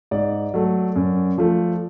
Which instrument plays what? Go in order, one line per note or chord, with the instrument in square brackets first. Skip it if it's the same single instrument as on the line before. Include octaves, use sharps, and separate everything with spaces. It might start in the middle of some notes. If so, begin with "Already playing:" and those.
[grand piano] G#2 D5
F#3 A3
F#2
F3 A3